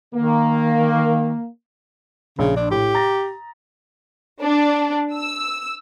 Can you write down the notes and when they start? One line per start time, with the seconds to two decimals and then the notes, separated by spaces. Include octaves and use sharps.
0.15 D#3 A#3
2.39 A#1 C#3
2.56 D4
2.71 A2 G4
2.94 A#5 A6 A#6
4.42 D4
5.13 E6